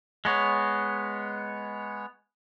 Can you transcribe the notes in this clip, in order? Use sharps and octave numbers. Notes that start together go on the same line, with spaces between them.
G#3 B3 C#5